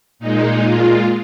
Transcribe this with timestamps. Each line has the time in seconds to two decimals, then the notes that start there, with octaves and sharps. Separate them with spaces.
0.19 A#2 G#3 D#4
0.61 A#2 G#3 F4